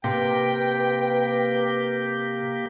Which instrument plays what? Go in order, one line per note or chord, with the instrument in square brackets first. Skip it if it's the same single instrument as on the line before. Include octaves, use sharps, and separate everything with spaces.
[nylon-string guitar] C3 [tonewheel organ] A#3 G4 [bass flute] B4 [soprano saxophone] G5